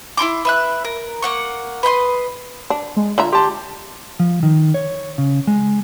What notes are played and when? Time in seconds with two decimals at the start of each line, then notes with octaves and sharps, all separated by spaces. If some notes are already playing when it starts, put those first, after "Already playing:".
0.17 E4 F4 C6 D6
0.45 B4 E5 F#6
0.85 A#4
1.22 A#3 F#5 C#6
1.83 B4 D#5 G5 C6
2.70 D4
2.97 G#3
3.18 D3 F4 E5 A#5
3.33 G4 A5 C6
4.20 F3
4.43 D#3
4.74 C#5
5.18 C#3
5.47 G#3